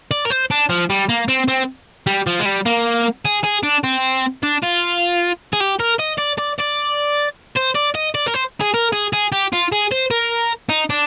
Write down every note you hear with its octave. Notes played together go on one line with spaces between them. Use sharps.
D5
A#4
C5
D4
F3
G3
A#3
C4
C4
G3
F3
G#3
G3
A#3
G#4
G#4
D4
C4
D4
F4
G#4
G4
A#4
D#5
D5
D5
D5
C5
D5
D#5
D5
A#4
C5
G#4
A#4
G#4
G#4
G4
F4
G#4
C5
A#4
D#4
D4